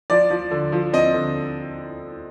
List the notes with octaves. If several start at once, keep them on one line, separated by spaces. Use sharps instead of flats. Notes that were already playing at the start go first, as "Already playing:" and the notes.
F3 D5
F3
D3
F3
C4 D#5
D3